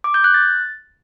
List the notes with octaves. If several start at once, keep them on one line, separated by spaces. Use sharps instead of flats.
D6
G6
F#6
A6